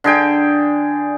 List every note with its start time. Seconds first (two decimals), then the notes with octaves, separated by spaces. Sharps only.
0.04 D3 G#4 G5